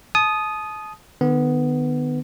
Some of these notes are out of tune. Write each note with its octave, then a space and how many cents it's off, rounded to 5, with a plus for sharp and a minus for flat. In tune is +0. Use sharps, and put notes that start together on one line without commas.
A5 -35 D#6 +0
D#3 -45 B3 +10